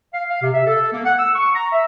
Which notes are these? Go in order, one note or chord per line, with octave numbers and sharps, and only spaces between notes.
F5
F5
C3
E5
A4
A#3
F#5
E6
C#6
A#5
E5